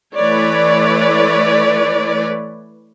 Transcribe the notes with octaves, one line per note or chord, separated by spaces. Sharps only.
E3 A3 B4 C#5 D5